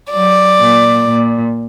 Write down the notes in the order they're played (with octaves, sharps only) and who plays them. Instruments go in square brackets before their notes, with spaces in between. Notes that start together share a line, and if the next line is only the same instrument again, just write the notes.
[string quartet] F#3 [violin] D5
[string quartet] A#2
A#2